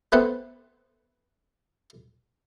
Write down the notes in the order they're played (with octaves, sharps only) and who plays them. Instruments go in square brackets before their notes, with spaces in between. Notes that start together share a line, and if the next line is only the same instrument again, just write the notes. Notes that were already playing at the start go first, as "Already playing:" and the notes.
[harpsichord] A3 B3 C4 A4 B4 C5